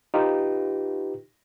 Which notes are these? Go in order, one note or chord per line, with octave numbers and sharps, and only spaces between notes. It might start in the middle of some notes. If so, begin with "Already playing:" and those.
D#4 F4 G4 B4